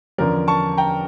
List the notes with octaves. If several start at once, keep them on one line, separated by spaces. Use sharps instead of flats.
E2 D3 F3 C#4 A#4 D5
A5 C#6
G5 A#5